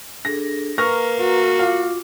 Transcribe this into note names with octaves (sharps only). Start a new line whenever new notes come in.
D4 G#4 A4 A#6
A#3 B4 A#5 C#6 F6 A#6
F#4
F4 F5 D6